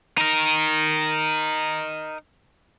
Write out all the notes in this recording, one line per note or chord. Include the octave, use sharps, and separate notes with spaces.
D#4 A#4